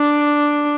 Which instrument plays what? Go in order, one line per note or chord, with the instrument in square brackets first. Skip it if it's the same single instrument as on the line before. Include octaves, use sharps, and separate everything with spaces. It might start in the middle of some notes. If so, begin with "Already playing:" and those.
Already playing: [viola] D4